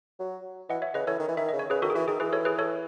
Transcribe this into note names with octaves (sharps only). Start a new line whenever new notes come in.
F#3
E3 D#5 F#5
C#5 E5
C#3 B4 D#5
E3 A4 C#5
D#3
E3
D#3 E5
C#3 D#5
C#5
C#3 G#4 B4
D#3 F#4 A4
G#4
E3 F#4
D#3 G#4
E3 G#4 B4
A4 C#5
G#4 B4
A4 C#5